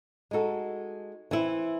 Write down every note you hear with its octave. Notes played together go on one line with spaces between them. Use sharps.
G#3 D#4 F#4 A4
E3 C4 E4